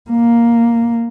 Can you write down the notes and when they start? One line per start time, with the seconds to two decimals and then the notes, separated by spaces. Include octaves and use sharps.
0.10 A#3